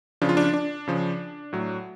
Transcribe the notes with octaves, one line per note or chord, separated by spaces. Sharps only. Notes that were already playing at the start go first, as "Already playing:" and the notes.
C#3 F3 D4
F4
D4
D4
C#3 F3
A2 F#3